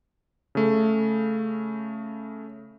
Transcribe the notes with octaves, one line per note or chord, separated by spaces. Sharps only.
C#3 A3